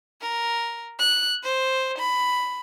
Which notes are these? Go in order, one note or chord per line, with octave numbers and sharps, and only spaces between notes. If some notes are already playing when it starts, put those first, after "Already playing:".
A#4
F#6
C5
B5